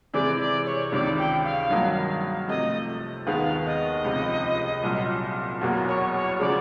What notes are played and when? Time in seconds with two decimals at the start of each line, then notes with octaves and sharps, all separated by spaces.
0.13 C3 E3 G#3 D5
0.39 D5
0.65 C#5
0.92 C#2 C3 D#3 D5
1.18 G5
1.44 F5
1.70 G2 D#3 F#3 A#3 D#4
2.48 C3 F3 A3 D#5
3.27 D#2 D#3 G#3 B3 F5
3.66 D#5
4.05 C#2 C3 F3
4.83 C2 A#2 F#3
5.61 E2 B2 F#3 A#3
5.88 C#5
6.14 C#5
6.40 C#3 F3 G#3 D5